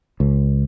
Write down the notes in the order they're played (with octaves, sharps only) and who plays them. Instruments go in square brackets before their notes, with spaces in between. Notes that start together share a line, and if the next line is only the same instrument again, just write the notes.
[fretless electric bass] C#2